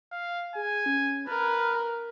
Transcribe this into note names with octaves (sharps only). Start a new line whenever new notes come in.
F5
G#4 G#5
C#4
A#4 B4 F6